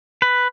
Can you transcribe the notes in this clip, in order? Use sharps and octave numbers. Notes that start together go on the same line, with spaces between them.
B4